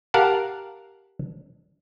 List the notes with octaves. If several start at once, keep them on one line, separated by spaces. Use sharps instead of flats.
G4 A#4 F5 F#5 A5